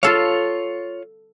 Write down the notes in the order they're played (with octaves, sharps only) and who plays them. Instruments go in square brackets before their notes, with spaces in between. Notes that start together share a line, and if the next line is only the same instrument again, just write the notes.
[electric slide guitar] F4 C#5 [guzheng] A4 F5